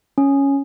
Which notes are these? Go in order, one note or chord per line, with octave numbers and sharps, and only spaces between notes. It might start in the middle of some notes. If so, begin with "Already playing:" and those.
C#4